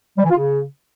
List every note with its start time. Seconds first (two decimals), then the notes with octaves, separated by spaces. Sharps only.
0.17 G3
0.23 E3
0.30 F4
0.36 C#3